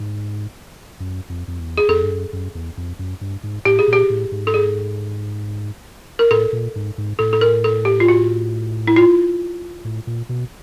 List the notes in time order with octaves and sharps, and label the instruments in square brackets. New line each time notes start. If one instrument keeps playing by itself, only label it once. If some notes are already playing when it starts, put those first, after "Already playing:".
Already playing: [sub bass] G#2
F#2
F2
F2
E2
[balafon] G#4
[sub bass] F2 [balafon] A4
[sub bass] G2
F#2
F#2
E2
F2
F#2
G2
G#2
[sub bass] A2 [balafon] G4
[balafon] G#4
[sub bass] A#2 [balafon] G4
[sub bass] A2
G#2
[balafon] A4
G#4
A#4
[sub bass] A2 [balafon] A4
[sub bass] A#2
G#2
G#2
[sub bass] A2 [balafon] A4
[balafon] A4
A#4
A4
G4
F4
F#4
E4
F4
[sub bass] A2
A#2
B2